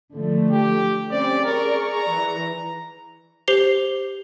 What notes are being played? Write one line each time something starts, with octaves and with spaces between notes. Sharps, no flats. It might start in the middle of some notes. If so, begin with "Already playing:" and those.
D3 F3 A3
G4
G3 C4 C#4 D5
G#4 A#4 D5 C#6
A#5
E3
G4 C5 C7 F7 G7